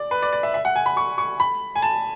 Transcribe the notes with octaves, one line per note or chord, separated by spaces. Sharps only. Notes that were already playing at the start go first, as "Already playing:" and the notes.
Already playing: D5
B4
D5
D5
E5
E5
F#5
G#5
B5
C#6
C#6
B5
G#5
A5